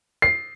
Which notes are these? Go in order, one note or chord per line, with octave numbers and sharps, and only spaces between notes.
C7